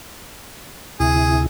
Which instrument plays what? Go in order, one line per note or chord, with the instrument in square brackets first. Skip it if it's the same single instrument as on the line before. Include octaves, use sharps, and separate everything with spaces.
[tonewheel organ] D2 C3 E4 [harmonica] G#4